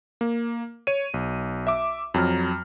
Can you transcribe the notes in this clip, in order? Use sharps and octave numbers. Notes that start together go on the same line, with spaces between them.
A#3
C#5 D#7
B1
E5 D6
F2 F#3 A#5 F6